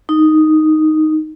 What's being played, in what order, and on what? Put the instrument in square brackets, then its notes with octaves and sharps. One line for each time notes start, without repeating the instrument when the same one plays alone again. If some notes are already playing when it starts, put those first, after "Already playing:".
[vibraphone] D#4